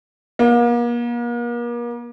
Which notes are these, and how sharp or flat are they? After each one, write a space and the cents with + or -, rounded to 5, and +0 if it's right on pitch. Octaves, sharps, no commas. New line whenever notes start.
A#3 +40